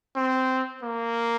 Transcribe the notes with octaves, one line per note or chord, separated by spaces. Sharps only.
C4
A#3